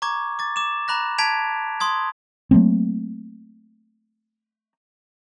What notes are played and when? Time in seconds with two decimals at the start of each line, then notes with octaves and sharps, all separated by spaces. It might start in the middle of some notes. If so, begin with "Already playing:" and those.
0.02 A#5 C#6 D6 G#6
0.39 D6 A6
0.56 D6 E7
0.88 A#5 B5 F#6 A#6
1.18 A5 G#6 B6 D7 F7
1.80 C6 D#6 G#6
2.51 F#3 A3 A#3 C4